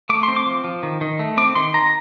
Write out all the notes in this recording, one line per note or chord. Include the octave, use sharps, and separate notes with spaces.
A3 D6
C4 C6
D6
F3
F3
D#3
D#3
A3
C4 D6
D#3 C6
D#3 A#5